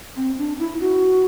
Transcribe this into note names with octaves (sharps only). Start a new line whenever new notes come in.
C4
D4
E4
F#4